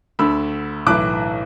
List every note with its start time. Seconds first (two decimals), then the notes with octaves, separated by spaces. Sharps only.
0.19 D2 D3 B5 E6
0.86 B1 A2 E3 D6 F#6